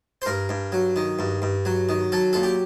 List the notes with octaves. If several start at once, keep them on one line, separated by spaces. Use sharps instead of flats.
C5
G2 A#4
G2
F#3
D#3
G2
G2
F#3
D#3
F#3 A4
A#2 A4
G4